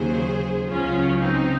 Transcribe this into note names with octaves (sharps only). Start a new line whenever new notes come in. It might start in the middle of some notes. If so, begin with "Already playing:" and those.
Already playing: D#2 C#3 F#3 G#4 C5
C#2 C#3 F#3 C#4 F4
C4 D#4